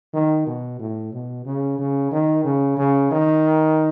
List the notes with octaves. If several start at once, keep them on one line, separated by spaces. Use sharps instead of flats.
D#3
B2
A2
B2
C#3
C#3
D#3
C#3
C#3
D#3